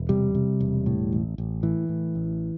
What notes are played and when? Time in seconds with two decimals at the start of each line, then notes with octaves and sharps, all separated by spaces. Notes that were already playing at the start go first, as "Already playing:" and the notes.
Already playing: E1
0.09 C3 G3
0.35 C3
0.60 E1
0.86 A2
1.13 A1
1.38 A1
1.63 A2 E3
1.89 A2
2.15 A1